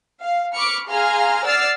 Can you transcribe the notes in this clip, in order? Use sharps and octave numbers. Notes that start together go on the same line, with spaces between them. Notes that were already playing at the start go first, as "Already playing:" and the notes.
F5
B5 C#6 D6 F6 C#7
G#4 F5 G#5 A#5 C6 F6
D5 F#5 E6 F6 A6 C7